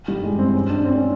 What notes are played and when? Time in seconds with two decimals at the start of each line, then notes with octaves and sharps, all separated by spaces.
0.08 G3
0.24 G#3
0.39 C4
0.54 C#4
0.70 D4
0.85 C4
0.95 C#4